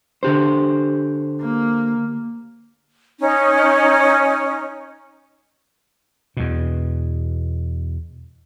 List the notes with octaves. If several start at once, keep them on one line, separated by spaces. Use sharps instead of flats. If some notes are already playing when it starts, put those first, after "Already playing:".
D3 G4 C5
A#3
C#4 D#4
E2 B2